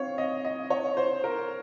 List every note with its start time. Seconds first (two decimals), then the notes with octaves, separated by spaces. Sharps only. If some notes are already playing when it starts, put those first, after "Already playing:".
Already playing: C4 C#5 F5
0.18 D#5
0.45 D#5
0.70 C#5
0.97 C5
1.24 A#4